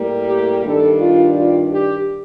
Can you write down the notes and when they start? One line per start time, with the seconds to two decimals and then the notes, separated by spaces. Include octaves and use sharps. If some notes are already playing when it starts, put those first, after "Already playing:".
Already playing: A2 G3 A#3
0.27 G4
0.63 G2 D#3 G3 D4 A4
1.00 F4
1.36 F4
1.72 G4